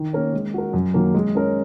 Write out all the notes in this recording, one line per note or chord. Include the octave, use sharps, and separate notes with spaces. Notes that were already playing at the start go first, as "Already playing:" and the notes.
Already playing: D#3
A#3 C#4 A#4 C#5
G#3
F#4 A#4
F#2
D#3 F#3 A#3 C#4
G#3
C#4 A#4 C#5